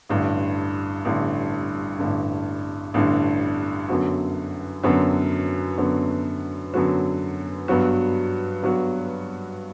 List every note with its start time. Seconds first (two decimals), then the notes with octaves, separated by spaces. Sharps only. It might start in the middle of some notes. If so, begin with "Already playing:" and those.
0.09 A1 G2 D3
1.05 A1 G2 D3
1.99 A1 G2 D3
2.94 A1 G2 D3
3.89 F#2 D3 F#3 B3 F#4
4.83 F#2 D3 F#3 B3 F#4
5.78 F#2 D3 F#3 B3 F#4
6.74 F#2 D3 F#3 B3 F#4
7.68 G2 F#3 B3 F#4
8.63 G2 F#3 B3 F#4